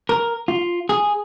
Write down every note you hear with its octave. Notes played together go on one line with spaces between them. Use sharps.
A#4
F4
G#4